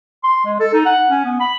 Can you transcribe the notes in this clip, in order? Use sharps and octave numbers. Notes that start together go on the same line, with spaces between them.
C6
G#3
A4
D#4
F#5
C#4
B3
B5